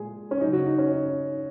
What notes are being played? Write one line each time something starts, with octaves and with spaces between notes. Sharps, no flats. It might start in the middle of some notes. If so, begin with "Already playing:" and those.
Already playing: A#2 G#3 G#4
C#4
C#3 F#3 D#4
F#4
D#4
C#4
D#4